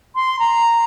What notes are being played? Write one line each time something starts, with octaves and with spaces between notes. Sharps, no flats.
C6
A#5